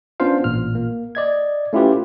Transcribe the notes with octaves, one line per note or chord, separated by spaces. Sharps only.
B3 C#4 D4 F4 C5 F5
A1 A#2 F6
A#3
D5 D#5 G#6
A3 C#4 E4 F4 G4 B4